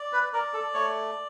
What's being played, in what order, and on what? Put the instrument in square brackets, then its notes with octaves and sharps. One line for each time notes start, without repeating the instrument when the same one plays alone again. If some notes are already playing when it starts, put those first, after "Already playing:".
Already playing: [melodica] D5
[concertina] B4
[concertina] A#4 [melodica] D5
[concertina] A4
[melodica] A3 [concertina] C#5